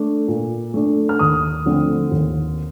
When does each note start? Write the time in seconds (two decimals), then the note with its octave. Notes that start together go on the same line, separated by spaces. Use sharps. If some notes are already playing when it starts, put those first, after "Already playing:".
Already playing: A3 D4
0.28 A#2
0.74 A3 D4
1.09 F6
1.19 D#2 D#6
1.66 D3 F3 A3 C4
2.11 D#2